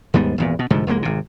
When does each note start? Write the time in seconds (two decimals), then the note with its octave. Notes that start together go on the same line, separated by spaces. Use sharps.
0.14 D#2 G#2 G3 B3
0.38 G#1 E2 A#2
0.59 B2
0.70 C2 G#2 D3 F3
0.87 F1 C2 G#3 A#3
1.02 G#1 C3